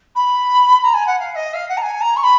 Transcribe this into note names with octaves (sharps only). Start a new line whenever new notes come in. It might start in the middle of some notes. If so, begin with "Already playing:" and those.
B5
A#5
G#5
F#5
F5
F5
D#5
F5
F#5
A#5
G#5
A#5
C#6
B5